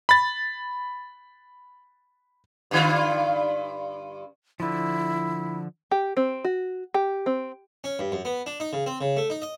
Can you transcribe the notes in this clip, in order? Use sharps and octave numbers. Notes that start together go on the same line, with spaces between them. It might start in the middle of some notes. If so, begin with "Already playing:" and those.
B5 A6
G2 D3 F4
D3 F3 E4
G4
C4
F#4
G4
C4
C#4
G2
F#2
B3
D4
D#4
C#3
C4
C#3
A3
D#4
D#5